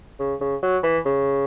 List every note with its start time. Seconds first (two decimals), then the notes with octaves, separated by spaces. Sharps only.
0.20 C#3
0.41 C#3
0.63 F#3
0.83 E3
1.05 C#3